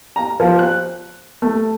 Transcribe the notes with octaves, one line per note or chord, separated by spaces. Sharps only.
A#5
F3
F#6
A3